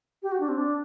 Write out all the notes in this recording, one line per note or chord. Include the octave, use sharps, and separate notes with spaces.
G4
F#4
D4
C4
D4